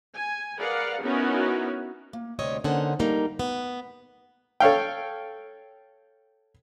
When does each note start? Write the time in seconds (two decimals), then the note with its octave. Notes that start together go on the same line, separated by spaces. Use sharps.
0.14 G#5
0.57 G#4 A#4 B4 D5 F5 F#5
1.02 B3 C#4 D#4 E4 F#4 A#4
2.13 A#3
2.39 D2 C3 G3 C#5 D#5
2.64 D3 A#3 C#4 D#4 C5 F#5
2.99 G3 A3 A#3 D#4
3.39 B3
4.60 A4 C#5 F5 G5